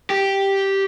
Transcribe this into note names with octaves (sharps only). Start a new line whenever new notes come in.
G4